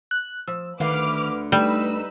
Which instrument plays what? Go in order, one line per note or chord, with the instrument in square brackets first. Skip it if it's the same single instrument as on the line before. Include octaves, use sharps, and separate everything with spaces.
[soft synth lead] F#6
[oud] F3 [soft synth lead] E6
[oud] D2 D3 F5 [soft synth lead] D#3 [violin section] B4 D6 F6
[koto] G3 [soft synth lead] A3 [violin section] D#4 B4 E6